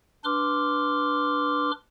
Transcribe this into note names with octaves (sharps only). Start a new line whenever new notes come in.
D4 B4 C6 D6 F6